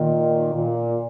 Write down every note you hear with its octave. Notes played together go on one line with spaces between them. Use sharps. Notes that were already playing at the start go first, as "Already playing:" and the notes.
Already playing: A#2 D#3
A#2